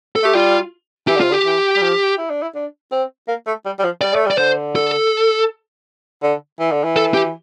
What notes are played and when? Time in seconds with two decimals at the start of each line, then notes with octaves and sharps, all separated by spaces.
0.16 A4
0.23 A3 G4
0.35 G3 F4
1.08 E3 G4
1.16 D3
1.20 C3 F4
1.30 D3 G4
1.45 E3
1.76 G3
1.81 F3
2.18 E4
2.30 D4
2.42 E4
2.55 D4
2.92 C4
3.28 A#3
3.47 A3
3.65 G3
3.79 G3
3.84 F3
4.01 G3 D5
4.13 A3
4.26 G3
4.30 D5
4.38 D3 C5
4.76 A4
6.23 D3
6.59 E3
6.72 D3
6.84 E3
6.96 A4
7.14 G4